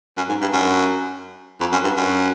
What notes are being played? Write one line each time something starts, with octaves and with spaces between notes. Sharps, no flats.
F#2
G#2
G2
F#2
F2
F#2
G2
F#2